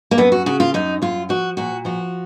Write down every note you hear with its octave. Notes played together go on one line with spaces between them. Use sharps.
A#3
F#2 B3
F#4
C#3 F#4
F4
F#2 D#4
F#2 F4
F3 F#4
A#2 F#4
F3 F#4